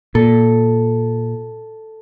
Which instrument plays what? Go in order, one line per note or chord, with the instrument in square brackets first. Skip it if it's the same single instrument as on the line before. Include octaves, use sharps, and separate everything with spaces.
[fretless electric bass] A#2 [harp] A4